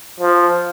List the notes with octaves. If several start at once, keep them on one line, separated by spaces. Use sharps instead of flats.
F3